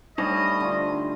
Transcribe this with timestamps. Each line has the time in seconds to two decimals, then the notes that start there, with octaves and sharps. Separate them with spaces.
0.18 G3 A3 D4 D#4 D#5
0.60 D3 F4